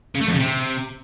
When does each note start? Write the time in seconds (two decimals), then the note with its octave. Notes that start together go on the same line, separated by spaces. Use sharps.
0.15 C#3
0.21 A3
0.27 F2
0.33 C#3
0.39 C3